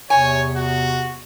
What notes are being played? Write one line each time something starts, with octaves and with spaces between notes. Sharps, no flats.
E2 C3 C#5 G#5
F#4